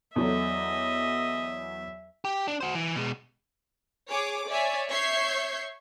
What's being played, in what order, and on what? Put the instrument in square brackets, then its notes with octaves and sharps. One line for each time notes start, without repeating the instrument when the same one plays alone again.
[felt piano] E2 F#3 A4 [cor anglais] D#5 [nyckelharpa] E5
[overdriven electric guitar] G4
D4
F#4 C5
E3
B2 G#3
[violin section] G#4 C#5 D6
C#5 D5 E5 G#5
C#5 E5 C#6 G6 G#6 C7